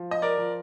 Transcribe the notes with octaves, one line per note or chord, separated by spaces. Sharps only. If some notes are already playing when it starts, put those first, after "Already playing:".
Already playing: F3
D#5
A#4 D5
F3